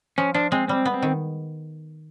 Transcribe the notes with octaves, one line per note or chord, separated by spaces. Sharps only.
F3 C#4
F3 D4
G#3 C4
G3 C4
B3
C4
D#3